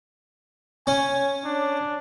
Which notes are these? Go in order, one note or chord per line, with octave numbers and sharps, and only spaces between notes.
C#4 G#5
D4